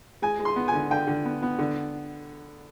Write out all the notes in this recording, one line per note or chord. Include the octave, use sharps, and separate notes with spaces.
G#3 G#5
G#3
C6
B3
G#5
D3
D3 G5
D3
B3
B3
D3